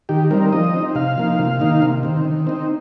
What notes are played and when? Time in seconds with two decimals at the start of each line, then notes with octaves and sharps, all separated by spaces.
0.09 D#3 G4
0.31 G3 C4 D#4 A#4
0.53 F3 D#5
0.74 C4 D#4
0.95 C3 F5
1.18 F3 A#3 D#4
1.39 C3
1.60 D#3 A#3 D#4
1.82 C3
2.03 D#3 C4
2.25 D#3
2.47 C4 D#4